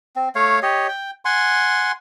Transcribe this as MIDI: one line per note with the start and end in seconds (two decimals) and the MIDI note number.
0.16 0.29 60
0.35 0.60 57
0.35 0.60 73
0.35 0.60 77
0.63 0.87 67
0.63 0.87 73
0.63 0.87 75
0.88 1.11 79
1.25 1.92 78
1.25 1.92 80
1.25 1.92 84